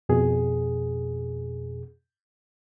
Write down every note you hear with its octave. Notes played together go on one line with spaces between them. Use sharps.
F2 B2 G#4